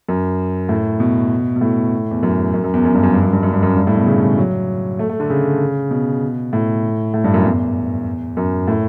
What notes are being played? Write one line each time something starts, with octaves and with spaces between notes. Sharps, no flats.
F#2
A2
B2
B2
A2
E2
F#2
F#2
F#2
E2
F#2
G2
F#2
G2
F#2
G2
F#2
G2
F#2
G2
A2
B2
C#3
C#3
F#3
A3
A3
D3
C#3
B2
A2
A2
G2
F#2
E2
F#2
A2